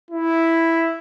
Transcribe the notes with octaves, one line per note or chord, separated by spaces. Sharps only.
E4